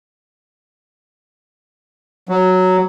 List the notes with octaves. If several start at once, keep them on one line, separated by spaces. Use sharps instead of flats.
F#3